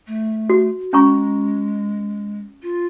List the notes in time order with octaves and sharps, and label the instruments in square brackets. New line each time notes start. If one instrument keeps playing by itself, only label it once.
[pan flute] A3
[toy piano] F#4
[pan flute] G#3 [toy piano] C#4 A#5 C#6
[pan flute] F4